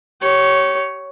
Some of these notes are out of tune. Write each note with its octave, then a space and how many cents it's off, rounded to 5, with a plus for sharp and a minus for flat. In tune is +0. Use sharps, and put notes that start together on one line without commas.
G4 -35 C#5 +0